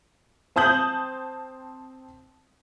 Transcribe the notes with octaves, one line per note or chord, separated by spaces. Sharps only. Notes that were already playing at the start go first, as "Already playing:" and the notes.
C4 A5 D#6 G6 F#7